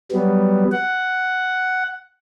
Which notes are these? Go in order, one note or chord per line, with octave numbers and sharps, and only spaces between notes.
F#3 G3 B3
F#5